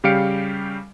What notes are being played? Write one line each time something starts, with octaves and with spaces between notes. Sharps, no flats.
C#3 G3 G4 F5 C#7 D7